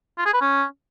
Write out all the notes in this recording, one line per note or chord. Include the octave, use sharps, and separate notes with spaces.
F4
G#4
B4
C#4